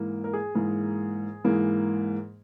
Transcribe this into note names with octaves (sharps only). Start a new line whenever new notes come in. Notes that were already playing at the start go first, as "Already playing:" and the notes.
Already playing: G#2 E3 A#3
A#4
G#4
G#2 E3 A#3
G#2 E3 A#3